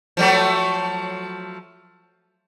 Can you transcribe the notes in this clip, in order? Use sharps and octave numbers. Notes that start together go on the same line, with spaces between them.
F3 F#3 A3